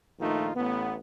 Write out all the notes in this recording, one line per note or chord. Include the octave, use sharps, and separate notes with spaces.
A#1 D#3 A3 D#4 F4
A1 A2 B3